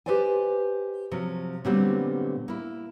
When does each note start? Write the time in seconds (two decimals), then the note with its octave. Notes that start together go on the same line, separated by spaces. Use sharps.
0.06 G4 A4 B4 C5 D5 G#5
1.11 C3 F3 F#3
1.65 A#2 D3 F#3 G3 B3 C4
2.48 A#3 E4